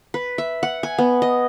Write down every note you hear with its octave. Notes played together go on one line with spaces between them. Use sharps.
B4
E5
F#5
G#5
B3
D#5